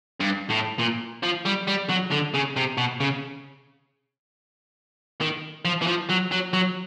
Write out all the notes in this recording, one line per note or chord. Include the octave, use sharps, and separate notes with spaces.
G2
A2
A#2
F3
G3
G3
F#3
D3
C#3
C3
B2
C#3
D#3
F3
E3
F3
F#3
F#3
F#3